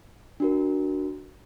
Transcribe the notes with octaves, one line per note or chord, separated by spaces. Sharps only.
D4 F#4 A#4